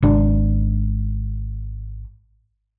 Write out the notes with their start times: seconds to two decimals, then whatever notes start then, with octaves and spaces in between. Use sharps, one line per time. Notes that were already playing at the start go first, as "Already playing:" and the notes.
0.02 G#1 D4